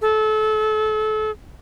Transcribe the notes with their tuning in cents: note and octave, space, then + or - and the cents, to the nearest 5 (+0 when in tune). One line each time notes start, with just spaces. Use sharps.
A4 -30